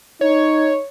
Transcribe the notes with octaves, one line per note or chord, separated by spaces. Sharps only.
D#4 C#5